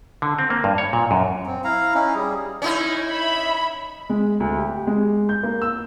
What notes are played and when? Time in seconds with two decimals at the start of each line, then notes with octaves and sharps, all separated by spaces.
0.22 D3
0.39 C4
0.50 A#3
0.64 G2
0.78 C#5
0.93 A#2
1.11 F#2
1.46 C4
1.64 E4 F5 A#5
1.94 C#4 D#4 E4
2.15 G3 G#4
2.62 C#4 D#4 E4
3.06 E5 B5
4.10 G#3
4.40 D2
4.58 G4
4.87 G#3
5.29 G6
5.43 A#3
5.62 E6